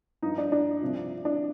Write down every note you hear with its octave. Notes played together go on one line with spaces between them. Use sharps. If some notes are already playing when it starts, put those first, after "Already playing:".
G2 F3 D#4
D4
D4
C2 C3 F3
D4